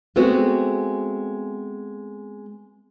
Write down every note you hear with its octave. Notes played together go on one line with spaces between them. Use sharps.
G#3 A3 B3 C4 F#4